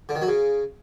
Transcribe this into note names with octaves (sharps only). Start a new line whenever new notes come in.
D3
D#3
F#3
C#3